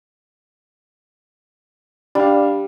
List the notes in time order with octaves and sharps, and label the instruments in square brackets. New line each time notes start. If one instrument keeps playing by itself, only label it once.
[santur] G3 [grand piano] D4 F5